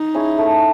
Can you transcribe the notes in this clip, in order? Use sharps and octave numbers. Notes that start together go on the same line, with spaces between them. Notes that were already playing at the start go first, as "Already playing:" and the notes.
Already playing: D#4
C#4 E4 G#4
A3